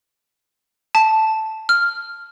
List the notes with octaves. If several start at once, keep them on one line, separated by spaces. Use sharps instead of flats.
A5
F6